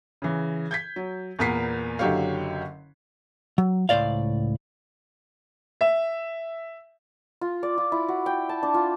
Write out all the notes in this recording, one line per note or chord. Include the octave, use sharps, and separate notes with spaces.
C#3 E3
G6 G#6 B6
F#3
E2 A#2 B3 A#4 B6 C7
F#1 D3 F#3 G4 C#5 F5
F#3
C#2 A2 C5 D5 F5
E5
F4
D5
F4
E4
F#4
G5
A5
D4
F4